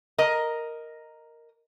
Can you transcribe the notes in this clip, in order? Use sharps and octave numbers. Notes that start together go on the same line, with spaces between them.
A#4 D#5